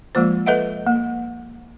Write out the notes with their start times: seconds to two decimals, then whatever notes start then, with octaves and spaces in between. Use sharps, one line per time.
0.15 F3 G#3 A#3 F4 C5
0.46 A4 B4 D#5 E5 F#5
0.87 A#3